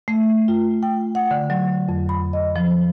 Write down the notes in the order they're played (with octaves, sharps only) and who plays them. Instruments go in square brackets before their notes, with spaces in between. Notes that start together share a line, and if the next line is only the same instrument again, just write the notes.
[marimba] A3
F4
G5
F#5
D3
F#3
F2
B5
D#5
F3